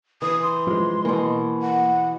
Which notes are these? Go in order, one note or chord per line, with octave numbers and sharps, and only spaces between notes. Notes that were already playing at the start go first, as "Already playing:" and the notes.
E3 D#6
C6
F3 G#3
B2 E3 A#3
F#5